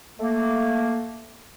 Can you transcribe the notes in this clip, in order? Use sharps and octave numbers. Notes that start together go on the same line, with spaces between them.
A3 A#3